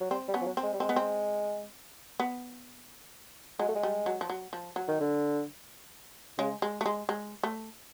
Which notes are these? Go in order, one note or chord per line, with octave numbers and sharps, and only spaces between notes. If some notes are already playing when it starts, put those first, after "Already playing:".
F#3
G3 C4
G3
B3 C#4
F3
F#3
C4
G#3
G3
G#3 C4
B3
C4
B3
F#3 G#3
A3
G#3
G3
F#3
F3
F#3
F3
F#3
D#3
D3
C#3 G#3
G#3
A3
G#3
G#3
A3